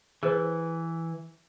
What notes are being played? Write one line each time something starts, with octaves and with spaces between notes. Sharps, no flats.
E3 G#4 B4 C5